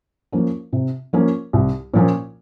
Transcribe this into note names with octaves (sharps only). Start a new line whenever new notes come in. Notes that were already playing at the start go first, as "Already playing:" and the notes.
F3 A#3 C#4
C3
F3 A#3 C#4
C2
A#2 F3 A#3 C#4